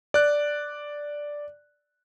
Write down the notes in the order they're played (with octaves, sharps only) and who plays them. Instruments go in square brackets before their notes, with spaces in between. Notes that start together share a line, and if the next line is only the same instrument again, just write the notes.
[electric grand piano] D5 F#6